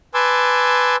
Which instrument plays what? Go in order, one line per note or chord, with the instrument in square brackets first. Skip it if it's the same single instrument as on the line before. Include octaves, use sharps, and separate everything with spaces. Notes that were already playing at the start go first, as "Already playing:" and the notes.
[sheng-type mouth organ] B4 G#5 A5 C6 D6 E6